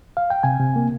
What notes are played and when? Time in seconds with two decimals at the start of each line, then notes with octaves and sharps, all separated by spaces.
0.17 F5
0.30 G5
0.43 C3 G#5
0.60 C3
0.76 A#3